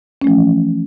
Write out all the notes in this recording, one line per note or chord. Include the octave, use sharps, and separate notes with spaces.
E3 F3 A3 C#4